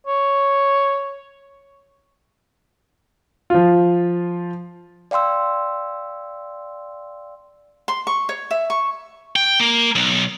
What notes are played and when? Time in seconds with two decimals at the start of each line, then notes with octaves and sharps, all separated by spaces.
0.07 C#5
3.50 F3 F4
5.11 D5 F5 G5 C6 E6
7.88 C6
8.07 C#6
8.29 C#5
8.51 E5
8.70 C#6
9.36 G5
9.60 A#3
9.95 B1